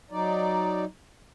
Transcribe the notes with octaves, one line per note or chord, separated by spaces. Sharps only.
F#3 D#4 D5